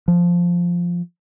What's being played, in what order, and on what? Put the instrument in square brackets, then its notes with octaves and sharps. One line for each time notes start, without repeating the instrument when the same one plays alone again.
[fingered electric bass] F3